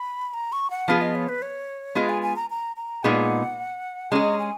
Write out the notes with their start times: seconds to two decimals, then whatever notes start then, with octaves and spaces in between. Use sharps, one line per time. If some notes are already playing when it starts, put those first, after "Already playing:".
Already playing: B5
0.34 A#5
0.52 C#6
0.70 F#5
0.88 F3 B3 F4 G#4 F5
1.01 D#5
1.15 C#5
1.29 B4
1.42 C#5
1.95 G#3 B3 F4 G#4 D#5
2.09 G#5
2.22 G#5
2.36 A#5
2.50 A#5
2.76 A#5
3.03 A#2 G#3 B3 D#4 G#4 F#5
4.11 G#3 C#4 G#4 A#5
4.39 G#5